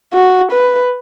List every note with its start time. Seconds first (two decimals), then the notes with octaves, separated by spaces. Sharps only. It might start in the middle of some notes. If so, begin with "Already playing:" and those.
0.13 F#4
0.52 B4